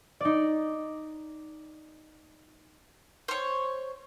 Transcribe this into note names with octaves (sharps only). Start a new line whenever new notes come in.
D#4 D5
C5 C#5